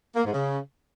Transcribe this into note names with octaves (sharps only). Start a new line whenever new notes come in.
A#3
G#2
C#3